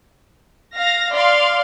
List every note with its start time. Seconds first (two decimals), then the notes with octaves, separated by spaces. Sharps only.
0.76 F5 A#6
1.13 D5 F5 C6